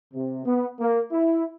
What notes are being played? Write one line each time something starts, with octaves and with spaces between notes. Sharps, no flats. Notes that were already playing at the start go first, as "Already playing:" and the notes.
C3
B3
A#3
E4